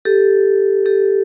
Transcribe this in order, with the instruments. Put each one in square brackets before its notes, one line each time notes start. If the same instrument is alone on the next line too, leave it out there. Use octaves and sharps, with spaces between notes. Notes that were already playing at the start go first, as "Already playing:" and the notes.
[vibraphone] G4 A4
G4 A4